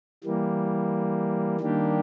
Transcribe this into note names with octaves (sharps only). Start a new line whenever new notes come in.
E3 G3 A#3
D#3 G3 A#3 D4 G4